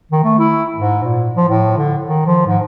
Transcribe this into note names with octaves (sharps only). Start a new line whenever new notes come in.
D#3
A3
E4
G#2
A#2
F3
A2
D3
D#3
F3
G#2